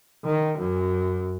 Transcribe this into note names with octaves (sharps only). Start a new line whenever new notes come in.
D#3
F#2